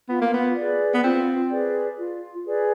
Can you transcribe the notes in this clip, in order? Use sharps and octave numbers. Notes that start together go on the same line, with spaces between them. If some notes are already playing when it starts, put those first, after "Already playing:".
B3 F4
A#3
B3
G#4 B4 D5
B3
C4 F4
G#4 B4 D5
F4
G#4 B4 D5